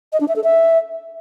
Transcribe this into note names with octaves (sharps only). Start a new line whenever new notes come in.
D#5
D4
E5
A4
E5